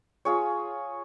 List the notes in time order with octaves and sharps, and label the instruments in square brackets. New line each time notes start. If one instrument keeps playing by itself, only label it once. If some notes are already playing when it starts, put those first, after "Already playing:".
[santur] F4 G#4 C#5